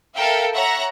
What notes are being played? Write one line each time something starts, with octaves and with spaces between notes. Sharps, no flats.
A4 A#4 E5 F5 G5
C#5 E5 F#5 A#5 A#6